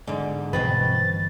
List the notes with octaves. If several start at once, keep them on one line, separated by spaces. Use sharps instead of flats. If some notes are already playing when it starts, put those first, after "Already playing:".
G#2 D3
G1 B2 E3 F3 C4 B4 A6